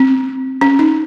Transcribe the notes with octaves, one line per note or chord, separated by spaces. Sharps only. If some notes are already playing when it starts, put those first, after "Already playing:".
Already playing: C4
C#4
D#4